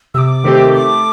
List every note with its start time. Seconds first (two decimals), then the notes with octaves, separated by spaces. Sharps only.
0.14 C3 E6
0.18 D6
0.44 D#3 A3 C4 G4
0.73 A3 D6